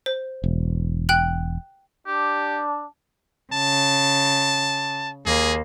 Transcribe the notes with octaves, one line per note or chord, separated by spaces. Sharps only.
C5
E1
G5 F#6 F#7
D4 G4
C#3 A5
D#2 A#3 G#4